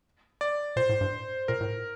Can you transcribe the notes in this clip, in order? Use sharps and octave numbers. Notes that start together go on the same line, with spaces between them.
D5
A#2 C5
A2
G2
A#2 A#4
A2